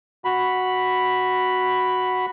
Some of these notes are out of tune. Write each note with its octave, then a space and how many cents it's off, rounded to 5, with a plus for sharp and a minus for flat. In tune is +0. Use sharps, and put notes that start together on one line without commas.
F#4 +0 B5 +0